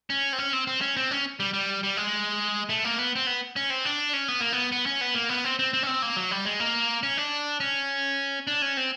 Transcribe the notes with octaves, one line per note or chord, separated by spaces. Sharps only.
C#4
C4
C#4
C4
C4
C#4
C4
C#4
G3
G3
G3
G#3
A3
A#3
B3
C4
B3
C#4
C4
D4
C#4
B3
A#3
B3
B3
C#4
B3
A#3
B3
C4
C4
C4
C#4
C4
A#3
F#3
G3
G#3
A#3
C#4
D4
C#4
D4
C#4
C4